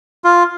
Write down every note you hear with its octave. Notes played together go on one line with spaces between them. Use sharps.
F4